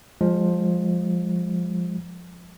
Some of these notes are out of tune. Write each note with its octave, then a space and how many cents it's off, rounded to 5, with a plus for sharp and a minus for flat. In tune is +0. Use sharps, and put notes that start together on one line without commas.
F3 +10 G#3 -25